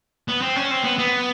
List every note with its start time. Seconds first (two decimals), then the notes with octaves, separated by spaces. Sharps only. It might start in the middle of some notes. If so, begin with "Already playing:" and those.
0.28 B3
0.42 C4
0.56 C#4
0.71 C4
0.84 B3
0.98 B3